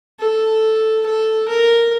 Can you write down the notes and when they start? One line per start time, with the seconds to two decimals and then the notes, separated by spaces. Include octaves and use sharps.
0.20 A4
1.06 A4
1.48 A#4